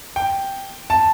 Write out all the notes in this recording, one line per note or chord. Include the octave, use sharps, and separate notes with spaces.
G5
A5